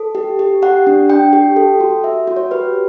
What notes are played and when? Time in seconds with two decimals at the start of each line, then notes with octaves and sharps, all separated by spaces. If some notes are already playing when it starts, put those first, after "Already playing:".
Already playing: A4
0.15 G4
0.39 G4
0.62 G4 F#5
0.87 D4
1.10 D4 G5
1.33 G4
1.56 A4
1.80 F#4
2.04 F#4 E5
2.27 F#4
2.36 C#5
2.51 G4 B4